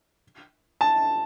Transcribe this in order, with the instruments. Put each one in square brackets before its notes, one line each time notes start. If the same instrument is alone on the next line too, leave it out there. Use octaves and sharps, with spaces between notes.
[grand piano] A5